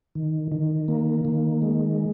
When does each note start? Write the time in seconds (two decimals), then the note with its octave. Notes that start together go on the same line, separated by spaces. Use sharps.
0.15 D#3
0.52 D#3
0.88 A#3
1.25 D#3
1.62 G#3